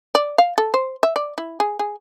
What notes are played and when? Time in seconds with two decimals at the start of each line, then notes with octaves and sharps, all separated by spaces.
0.15 D5
0.38 F5
0.58 A4
0.74 C5
1.03 E5
1.16 D5
1.38 E4
1.60 G#4
1.79 G#4